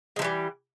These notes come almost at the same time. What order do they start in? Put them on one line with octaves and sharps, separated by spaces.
G#3 F3 E3 G3